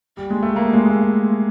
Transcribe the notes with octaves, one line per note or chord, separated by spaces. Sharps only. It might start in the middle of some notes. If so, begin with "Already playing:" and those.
G3
G#3
A3
A#3
G#3
G#3
A3